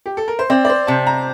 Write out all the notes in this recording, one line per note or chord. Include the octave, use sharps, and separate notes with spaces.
G4
A4
A#4
C5
C4 D5
D5
C5
C3 A5
A#5